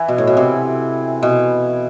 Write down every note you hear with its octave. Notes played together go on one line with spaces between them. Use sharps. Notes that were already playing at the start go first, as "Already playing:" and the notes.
Already playing: E3
B2
A2
B2
C3
B2